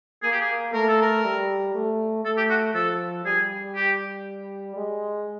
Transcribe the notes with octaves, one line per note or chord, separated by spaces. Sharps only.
A#3 G#4
G4
G#4
A3 A#4
A4
A#4
G3
A3
A3 A4
G4
F#4
F3 A4
G3 G#4
G4
G#3